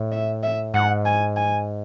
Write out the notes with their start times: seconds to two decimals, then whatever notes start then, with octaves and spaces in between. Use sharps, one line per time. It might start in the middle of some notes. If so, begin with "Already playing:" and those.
Already playing: A2
0.12 E5
0.43 E5
0.74 G#2 F#5
1.06 G#5
1.36 G#5